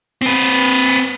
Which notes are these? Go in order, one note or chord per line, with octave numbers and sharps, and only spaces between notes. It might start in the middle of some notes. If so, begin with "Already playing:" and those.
C4 B4